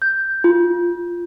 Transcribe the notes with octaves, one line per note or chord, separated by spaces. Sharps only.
G6
F4